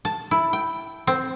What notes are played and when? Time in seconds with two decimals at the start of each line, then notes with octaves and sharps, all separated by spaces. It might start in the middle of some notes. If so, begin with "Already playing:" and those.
0.05 A5
0.31 E4
0.53 G5
1.07 C4